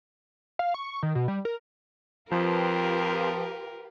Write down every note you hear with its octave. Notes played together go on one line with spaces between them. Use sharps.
F5
C#6
C#6
D#3
B2
G3
A#4
F2 F3 F4 G4 A#4 B4